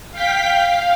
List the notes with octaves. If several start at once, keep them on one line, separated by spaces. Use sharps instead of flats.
F5 G5 B6
F5